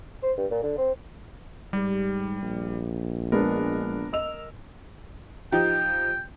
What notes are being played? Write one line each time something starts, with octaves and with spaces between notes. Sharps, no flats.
C5
G2
A#2
D3
C4
G#2 G3 G4
A#1
G#3 B3 D4 A#4
D#5 E6 F7
F3 D#4 G4 G5